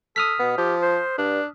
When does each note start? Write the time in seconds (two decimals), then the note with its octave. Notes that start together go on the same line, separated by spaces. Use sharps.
0.16 A4 D#6 F6 B6
0.39 B2 B3
0.58 F3 G4
0.83 C5
1.18 G2 D4